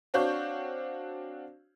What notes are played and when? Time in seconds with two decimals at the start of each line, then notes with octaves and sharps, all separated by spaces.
0.14 C4 D4 F#4 C#5 F5 G6